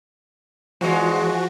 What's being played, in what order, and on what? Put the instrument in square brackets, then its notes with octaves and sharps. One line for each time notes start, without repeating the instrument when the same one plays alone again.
[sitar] E2 G#3 [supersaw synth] F3 F#4